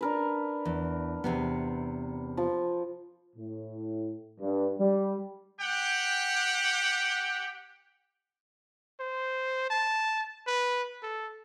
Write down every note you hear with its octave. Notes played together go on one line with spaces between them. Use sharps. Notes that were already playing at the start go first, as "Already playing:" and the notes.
D4 A#4 B4
E2
E2 C3 B3
F3
A2
G2
G3
G4 F#5 G5
C5
A5
B4
A4